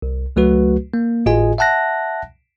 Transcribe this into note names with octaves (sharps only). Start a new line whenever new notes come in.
C2
C#2 F#3 A3 F#4 B4
A#3
G#1 A2 F4 G#4 D#5 G#5
E5 F#5 A5 F#6 A#6